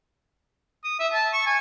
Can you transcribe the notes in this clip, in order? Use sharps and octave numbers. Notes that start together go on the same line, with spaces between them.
D#6
E5
A5
C#6
G#5